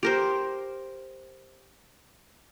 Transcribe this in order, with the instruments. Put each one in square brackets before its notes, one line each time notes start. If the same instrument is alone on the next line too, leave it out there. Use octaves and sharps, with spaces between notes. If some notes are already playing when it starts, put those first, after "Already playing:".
[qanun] G4 A#4 C5